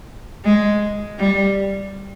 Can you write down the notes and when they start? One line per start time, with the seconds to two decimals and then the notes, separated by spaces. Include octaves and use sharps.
0.44 G#3
1.18 G3